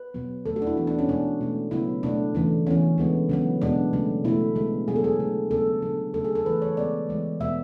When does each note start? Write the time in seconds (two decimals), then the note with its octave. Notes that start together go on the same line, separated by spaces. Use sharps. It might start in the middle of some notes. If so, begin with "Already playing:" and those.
Already playing: B4
0.14 B2 F#3 B3
0.46 D3 A3 A4
0.56 F#4
0.62 D4
0.67 E4
0.77 E3 B3
0.87 D4
0.99 C#4
1.08 B2 G#3 B3 D4
1.41 B2 A3
1.71 C#3 F#3 B3 E4
2.03 B2 A3 D4
2.35 C#3 E3 A3
2.67 E3 B3 C#4
2.98 D3 G#3 B3
3.29 C#3 F#3 B3
3.62 B2 G#3 B3 D4
3.93 C#3 F#3 A3
4.25 B2 A3 E4
4.56 D3 G#3 B3
4.88 B2 F#3 B3 G#4
4.96 A4
5.04 G#4
5.20 D3 A3
5.51 C#3 F#3 B3 A4
5.82 D3 F#3 B3
6.14 C#3 F#3 A3 A4
6.24 G#4
6.35 A4
6.45 E3 A3 B4
6.62 C#5
6.77 C#3 G#3 B3 D5
7.09 E3 G#3 B3
7.40 B2 G#3 B3 E5